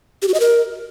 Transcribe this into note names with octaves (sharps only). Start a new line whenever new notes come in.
G4
F#4
D#5
A#4